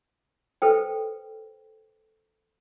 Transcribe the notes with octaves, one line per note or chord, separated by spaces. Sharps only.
A4 B4 C5 G5